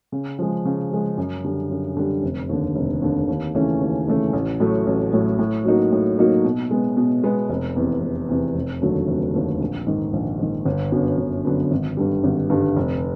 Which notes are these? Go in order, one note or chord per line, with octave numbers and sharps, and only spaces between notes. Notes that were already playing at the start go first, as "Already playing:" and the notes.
C#3
F3 G#3
C#3
F3 G#3
F#2
D3 G3
F#2
D3 G3
F1
D#2 D3
F1
D#2 D3
D#2
C#3 E3 A3 C#4
D#2
C#3 E3 A3 C#4
A1
A2 F#3 A3
A1
A2 F#3 A3
A2
F#3 A#3 D#4 F#4
A2
F#3 A#3 D#4 F#4
B2
G#3 B3
B2
G#3 B3
F1
E2 C3
F1
E2 C3
F1
D#2 D3 F#3 A3
F1
D#2 D3 F#3 A3
A#1
G#2 D#3
A#1
G#2 D#3
G1
F#2 D3 F#3 B3
G1
F#2 D3 F#3 B3
G#1
G2 D3 G3
G#1
G2 D3 G3
F1